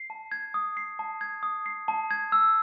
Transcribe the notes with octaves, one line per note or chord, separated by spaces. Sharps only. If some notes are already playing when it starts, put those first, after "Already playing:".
Already playing: C7
A5
G#6
D#6
C7
A5
G#6
D#6
C7
A5
G#6
E6